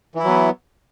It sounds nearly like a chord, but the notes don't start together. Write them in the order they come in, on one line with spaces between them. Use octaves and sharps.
E3 E4 F#3 B3